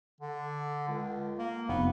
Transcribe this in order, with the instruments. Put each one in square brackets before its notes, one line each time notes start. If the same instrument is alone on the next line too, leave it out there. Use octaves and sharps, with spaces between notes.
[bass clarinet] D3
C#2
A#3
[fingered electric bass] F1 [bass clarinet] B3